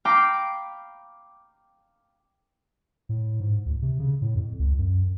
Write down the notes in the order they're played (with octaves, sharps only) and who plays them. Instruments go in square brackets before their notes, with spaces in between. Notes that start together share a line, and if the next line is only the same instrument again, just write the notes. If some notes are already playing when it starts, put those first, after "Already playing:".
[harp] F5 G5 A#5 B5 D6
[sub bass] A2
G#2
D2
C3
C#3
A2
F2
C#2
F#2